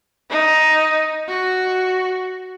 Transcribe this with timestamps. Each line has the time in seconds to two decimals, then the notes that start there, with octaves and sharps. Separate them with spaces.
0.30 D#4
1.28 F#4